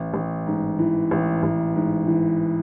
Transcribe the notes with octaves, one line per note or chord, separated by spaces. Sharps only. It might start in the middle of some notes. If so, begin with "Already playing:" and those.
Already playing: A1
A1
G#2
E3
A1
A1
G#2
E3